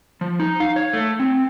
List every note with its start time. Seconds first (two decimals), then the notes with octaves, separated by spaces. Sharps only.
0.21 F3
0.39 D#4
0.60 F5
0.76 C#5
0.93 A3
1.20 C4